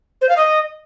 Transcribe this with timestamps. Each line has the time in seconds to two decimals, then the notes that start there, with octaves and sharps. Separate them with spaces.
0.21 C5
0.29 F5
0.37 D#5